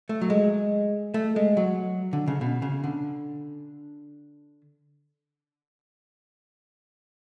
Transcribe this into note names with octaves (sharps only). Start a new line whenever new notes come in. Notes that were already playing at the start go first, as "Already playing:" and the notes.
A3
F#3
G#3
A3
G#3
F#3
D3
C#3
B2
C#3
D3